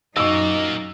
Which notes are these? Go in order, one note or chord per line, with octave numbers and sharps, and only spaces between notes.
F#2 A#2 A#3 D#4 F#4 D#5 C#6 E6